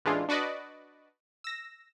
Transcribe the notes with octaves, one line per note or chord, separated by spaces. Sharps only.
A1 E3 G#3 D4 F4
D4 F#4 B4 D5 D#5
E6 A#6